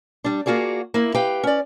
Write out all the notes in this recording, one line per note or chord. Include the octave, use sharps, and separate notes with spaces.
G3 D4
A#3 F4 F#4 G#4 D5
A#3 E4
G4 B4 F5 G5
C#4 D5